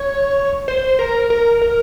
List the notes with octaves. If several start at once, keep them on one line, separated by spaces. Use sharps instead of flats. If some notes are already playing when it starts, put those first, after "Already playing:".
Already playing: C#5
C5
A#4
A#4
A#4